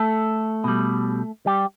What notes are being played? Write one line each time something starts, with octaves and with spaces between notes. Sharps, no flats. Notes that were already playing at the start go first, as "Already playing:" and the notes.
Already playing: A3 A4
B2 G3
G3 G4